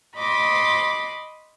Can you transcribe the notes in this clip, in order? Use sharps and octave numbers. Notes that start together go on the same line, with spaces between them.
D#5 B5 C6 D6